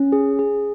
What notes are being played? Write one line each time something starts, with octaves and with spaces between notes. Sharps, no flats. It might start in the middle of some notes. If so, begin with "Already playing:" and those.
Already playing: C#4
G#4
G#4